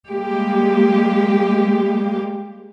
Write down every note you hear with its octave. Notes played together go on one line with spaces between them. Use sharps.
G3 G#3 A#3 G4